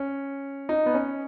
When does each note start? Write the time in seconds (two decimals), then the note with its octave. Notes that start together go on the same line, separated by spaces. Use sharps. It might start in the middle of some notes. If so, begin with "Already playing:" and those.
Already playing: C#4
0.69 D#4
0.86 B3
0.94 C#4